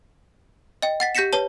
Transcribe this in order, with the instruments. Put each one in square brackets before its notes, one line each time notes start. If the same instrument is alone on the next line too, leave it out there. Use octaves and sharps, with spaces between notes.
[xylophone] D#5 G5
F#5 A6 B6
G4 G6 A#6 B6 C#7 E7
B4 C#5 A5